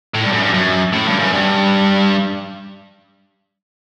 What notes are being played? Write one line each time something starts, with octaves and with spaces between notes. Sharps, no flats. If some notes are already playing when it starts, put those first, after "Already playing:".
A2
G2
F#2
G2
F#2
A2
G2
F#2
G2